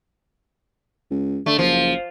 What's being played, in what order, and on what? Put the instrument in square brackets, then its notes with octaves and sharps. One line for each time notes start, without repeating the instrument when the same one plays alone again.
[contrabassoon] C#2
[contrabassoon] D3 [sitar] A3
[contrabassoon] F#1 [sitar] F3